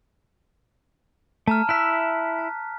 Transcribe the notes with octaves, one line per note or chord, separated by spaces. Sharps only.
A3 A5 A#5 F6
E4 E5 F#6 B6
A5